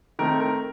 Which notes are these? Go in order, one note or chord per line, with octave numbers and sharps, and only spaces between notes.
D#3 A3 C4 A#4
A#4